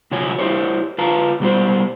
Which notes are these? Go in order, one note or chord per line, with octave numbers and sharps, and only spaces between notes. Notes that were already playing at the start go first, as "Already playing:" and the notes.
C3 F3 F#3 C#5 G#5
E4 G4 C5 C#5
F4 B4 F5 A5 A#5
B2 G3 G4 C5